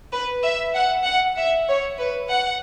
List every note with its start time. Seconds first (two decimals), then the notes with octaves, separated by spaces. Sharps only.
0.13 B4
0.44 E5
0.75 F#5
1.05 F#5
1.37 E5
1.68 C#5
1.99 B4
2.30 F#5